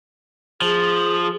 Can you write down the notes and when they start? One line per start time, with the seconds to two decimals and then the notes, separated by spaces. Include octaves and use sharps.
0.62 F3 G#4